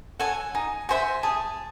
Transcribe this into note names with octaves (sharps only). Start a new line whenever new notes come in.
A4 C#5 F#5 G#5
D#4 G#5
F#4 C5 E5 G#5
G#4 A5